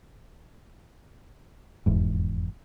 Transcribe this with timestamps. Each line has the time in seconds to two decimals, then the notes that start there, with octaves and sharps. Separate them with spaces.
1.86 F1 E2 G#2